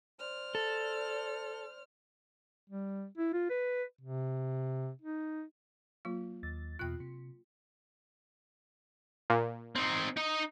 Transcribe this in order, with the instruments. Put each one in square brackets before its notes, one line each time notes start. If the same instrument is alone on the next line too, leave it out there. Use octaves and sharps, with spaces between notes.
[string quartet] C5 D5 F6
[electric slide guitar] A4
[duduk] G3
E4
F4
B4
C3
D#4
[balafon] F#3 A#3 F4
[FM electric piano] D#2 A6
[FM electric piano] E2 B2 F#6 [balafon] F4 G5
[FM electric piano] C3
[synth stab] A#2
[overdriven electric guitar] C4 D#4
D#4 D#5